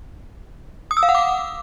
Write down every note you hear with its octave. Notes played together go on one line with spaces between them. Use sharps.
D#6
E6
F5
F#5
D6